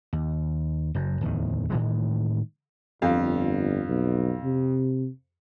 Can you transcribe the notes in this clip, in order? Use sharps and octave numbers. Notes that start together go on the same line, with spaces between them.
D#2
F#1 F#2
D1 E2 D#3
A2 D#3 E3 G#3
G1 F2 F5
B1
C3